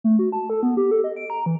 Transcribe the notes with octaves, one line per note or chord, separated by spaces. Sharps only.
A3
F#4
A5
A4
B3
G4
A4
D#5
D7
A#5
E3